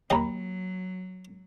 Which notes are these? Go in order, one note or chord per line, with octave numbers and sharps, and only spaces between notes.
D#2 F#3 D#5 G5 A#5 B5